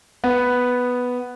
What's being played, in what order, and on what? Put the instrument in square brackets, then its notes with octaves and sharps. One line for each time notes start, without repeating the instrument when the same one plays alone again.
[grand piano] B3